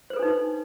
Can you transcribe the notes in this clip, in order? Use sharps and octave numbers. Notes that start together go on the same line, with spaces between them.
D4 D#4 A4 B4 C5